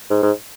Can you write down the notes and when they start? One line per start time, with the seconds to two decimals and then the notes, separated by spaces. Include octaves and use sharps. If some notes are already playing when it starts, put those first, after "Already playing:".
0.10 G#2
0.23 G#2